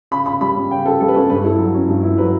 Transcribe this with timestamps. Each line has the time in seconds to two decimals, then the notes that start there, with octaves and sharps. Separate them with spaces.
0.11 C#3 B5
0.26 C#3 B5
0.41 G3 B5
0.56 C#4
0.71 C#3 G5
0.86 C#3 A4
1.00 G3 A4
1.08 B4
1.14 C#4 A4
1.30 G2 B4
1.44 E4 A4
1.59 F#3
1.74 C#4
1.89 G2
2.03 E4
2.18 F#3 B4